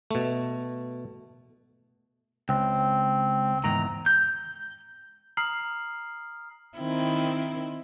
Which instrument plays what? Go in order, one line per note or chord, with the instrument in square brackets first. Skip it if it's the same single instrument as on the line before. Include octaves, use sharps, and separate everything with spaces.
[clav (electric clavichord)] B2 A3
[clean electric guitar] C#2 [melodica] C4
[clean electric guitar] E2 G#2 D#3 [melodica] A#5
[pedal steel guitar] G6
[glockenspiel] A#5 D#6 F6 C7 F#7
[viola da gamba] D#3 C4 E4